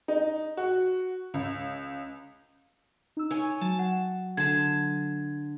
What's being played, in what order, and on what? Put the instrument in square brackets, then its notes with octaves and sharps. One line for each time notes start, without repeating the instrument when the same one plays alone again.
[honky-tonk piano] D#4
F#4
C#2
[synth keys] D#4 E6
[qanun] C#5 G#5
[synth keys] F#3 [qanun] A5
[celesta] F#5
[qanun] D3 A5 [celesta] G#6